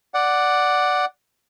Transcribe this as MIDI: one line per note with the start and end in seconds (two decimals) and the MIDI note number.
0.14 1.05 74
0.14 1.05 78